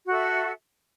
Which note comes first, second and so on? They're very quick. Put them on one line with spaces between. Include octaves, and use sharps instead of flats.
F#4 A4 E5